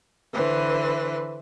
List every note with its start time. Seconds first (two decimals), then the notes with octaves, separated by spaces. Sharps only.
0.33 D3 E3 B4 C5